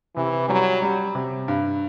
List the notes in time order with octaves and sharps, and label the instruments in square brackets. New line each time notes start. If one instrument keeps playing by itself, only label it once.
[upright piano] C3 [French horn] E3
[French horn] F#3 [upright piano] G3
[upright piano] G3
C3
G2